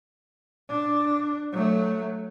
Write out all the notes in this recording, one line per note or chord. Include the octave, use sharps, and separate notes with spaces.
D4
F#3 A3